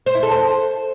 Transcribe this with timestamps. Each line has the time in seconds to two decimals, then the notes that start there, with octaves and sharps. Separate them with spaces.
0.06 C5
0.15 E4
0.23 A4
0.31 C5